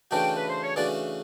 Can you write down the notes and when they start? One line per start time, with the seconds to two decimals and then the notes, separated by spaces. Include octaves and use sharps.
0.11 C#3 E3 A3 D4 F#4 G5
0.35 B4
0.49 C5
0.62 C#5
0.76 C#3 E3 A3 D4 F#4 D5